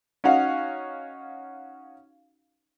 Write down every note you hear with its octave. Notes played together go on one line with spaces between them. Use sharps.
C#4 D#4 F#4 F5 F#5